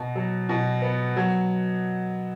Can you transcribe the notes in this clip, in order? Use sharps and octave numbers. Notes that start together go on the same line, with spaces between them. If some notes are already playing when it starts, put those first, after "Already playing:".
Already playing: B2
F#3
B2
B3
F#3